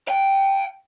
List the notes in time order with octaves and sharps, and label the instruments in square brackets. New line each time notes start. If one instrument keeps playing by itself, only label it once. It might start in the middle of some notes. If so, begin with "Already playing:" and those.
[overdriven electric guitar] F5 G5